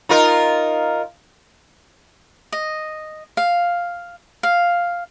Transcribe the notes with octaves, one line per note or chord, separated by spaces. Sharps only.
D#4 F4 A#4
D#5
F5
F5